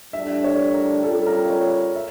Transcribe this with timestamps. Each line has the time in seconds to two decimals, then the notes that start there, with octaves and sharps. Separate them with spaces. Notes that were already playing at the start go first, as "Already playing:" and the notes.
0.13 A2 G3 D4 E5
0.44 C#5
0.74 A#4
1.04 G3 C#4 F4 A4
1.27 A#4
1.50 C#5
1.95 E5